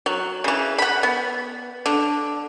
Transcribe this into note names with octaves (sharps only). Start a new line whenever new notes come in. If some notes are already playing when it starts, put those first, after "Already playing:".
F#3
C#3 E3
F#5 B5
B3
D3